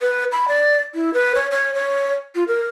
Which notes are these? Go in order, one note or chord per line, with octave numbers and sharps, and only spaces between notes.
B4
B5
D5
E4
B4
C#5
C#5
C#5
F4
A#4